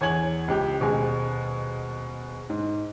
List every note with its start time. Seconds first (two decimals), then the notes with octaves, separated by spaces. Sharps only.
0.01 E2 C#5 G#5 G#6 F#7
0.48 C#2 G4
0.80 D#1 B2 G#3 G#5
2.50 G#2